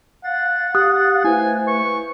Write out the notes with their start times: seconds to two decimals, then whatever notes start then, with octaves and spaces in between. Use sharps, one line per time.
0.24 F5 F#5 A6
0.75 G4 D#6 F#6
1.24 A3 E4 B4 C5 G#5
1.68 C#6